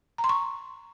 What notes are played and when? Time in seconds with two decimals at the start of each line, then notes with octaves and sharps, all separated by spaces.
0.18 A#5
0.24 C6
0.29 C#6